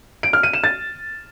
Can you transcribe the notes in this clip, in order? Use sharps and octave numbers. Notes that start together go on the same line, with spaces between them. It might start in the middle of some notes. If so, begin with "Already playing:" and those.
D7
F6
D#7
E7
A6